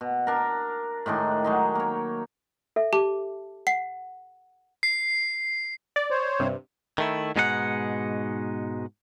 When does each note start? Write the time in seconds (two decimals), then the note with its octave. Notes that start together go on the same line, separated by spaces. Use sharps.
0.01 B2
0.27 D4 A#4
1.06 A2 D#3 G#3 D4
1.44 F#3 G#3 D#4
1.75 A#3 C#5
2.76 A4 E5
2.93 G4 A5 D6
3.67 F#5 C7
4.83 C7
5.96 D5
6.10 C5 C#5
6.39 G2 C3
6.98 D#3 A3 E4
7.36 G#2 B2 G#3 D#4 G4 F#5